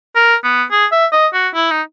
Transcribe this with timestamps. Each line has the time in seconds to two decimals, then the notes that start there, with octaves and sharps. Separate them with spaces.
0.16 A#4
0.44 B3
0.71 G#4
0.92 E5
1.13 D#5
1.34 F#4
1.55 E4
1.71 D#4